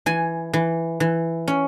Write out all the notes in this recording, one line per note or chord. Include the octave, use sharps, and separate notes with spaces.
E3 G#5
E3
E3
C#4